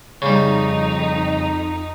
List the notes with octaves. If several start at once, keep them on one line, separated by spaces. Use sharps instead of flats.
F2 C#3 G3 D#4